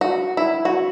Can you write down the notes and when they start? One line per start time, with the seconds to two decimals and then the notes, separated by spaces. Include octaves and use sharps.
0.01 F#4
0.37 E4
0.65 F#4